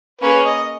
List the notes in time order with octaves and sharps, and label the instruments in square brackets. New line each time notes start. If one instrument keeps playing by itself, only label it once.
[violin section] A#3 C#4 G#4 C#5 [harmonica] B4
[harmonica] D#5